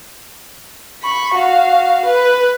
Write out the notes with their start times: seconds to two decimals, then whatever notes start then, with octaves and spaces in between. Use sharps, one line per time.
1.02 B5 C#6
1.35 F#4 F5
2.05 B4